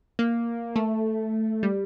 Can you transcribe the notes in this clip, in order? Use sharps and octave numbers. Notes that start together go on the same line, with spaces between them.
A#3
A3
G3